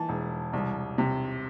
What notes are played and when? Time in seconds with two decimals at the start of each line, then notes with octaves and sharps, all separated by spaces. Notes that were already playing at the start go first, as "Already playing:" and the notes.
Already playing: E3 A5
0.09 E1
0.53 C2
0.98 C3